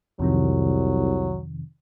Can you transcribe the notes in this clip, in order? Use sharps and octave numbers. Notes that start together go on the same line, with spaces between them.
C2 F2 C3 D#3 F#3